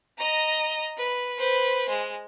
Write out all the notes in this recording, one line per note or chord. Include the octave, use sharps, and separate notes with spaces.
D#5 A#5
B4
B4 C5
G#3